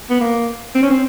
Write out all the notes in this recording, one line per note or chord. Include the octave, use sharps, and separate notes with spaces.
B3
A#3
C4
C#4
C4